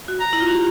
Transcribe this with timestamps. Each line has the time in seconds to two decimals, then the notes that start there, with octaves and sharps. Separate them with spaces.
0.08 F#4
0.20 A#5
0.33 E4
0.40 F4
0.47 F#4
0.54 G4